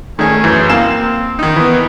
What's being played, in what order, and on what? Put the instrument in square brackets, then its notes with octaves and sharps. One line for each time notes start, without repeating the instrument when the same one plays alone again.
[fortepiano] D#3 G#4 [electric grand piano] A3 [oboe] C#4
[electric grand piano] F#2 E3 [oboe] C5
[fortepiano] A#3 F5 [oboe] C4 [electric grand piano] E7
[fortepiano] D#3 D#4
[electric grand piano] E3 B3 [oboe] B5